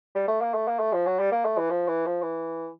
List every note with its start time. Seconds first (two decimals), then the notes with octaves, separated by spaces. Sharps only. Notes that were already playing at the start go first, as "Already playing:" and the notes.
0.15 G3
0.28 A3
0.42 A#3
0.54 A3
0.67 A#3
0.80 A3
0.93 F3
1.06 F#3
1.19 G3
1.32 A#3
1.45 A3
1.58 E3
1.70 F3
1.88 E3
2.06 F3
2.22 E3